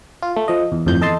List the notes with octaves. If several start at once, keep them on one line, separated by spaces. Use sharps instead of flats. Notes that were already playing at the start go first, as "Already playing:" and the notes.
F4
A3
F3 D#5
E2
G1 F2 A2 G6
E2 A4 D#5 A5 C6